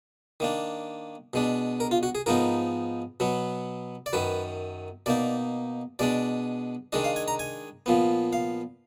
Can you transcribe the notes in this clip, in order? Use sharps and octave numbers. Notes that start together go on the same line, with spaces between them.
D#3 A#3 D4
B2 G#3 D4
A#4
F4
F#4
G#4
G#2 F3 B3 D#4 A#4
B2 F#3 B3
D5
F#2 D#3 F#3 B4
B2 A#3 D#4 D5
B2 G#3 D4 D5
D#3 G#3 D4 D#5
F5
G#5
A#5
G#5
A#2 F3 B3
F5